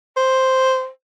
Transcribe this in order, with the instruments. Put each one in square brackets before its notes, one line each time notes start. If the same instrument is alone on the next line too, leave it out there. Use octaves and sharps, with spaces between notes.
[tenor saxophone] C5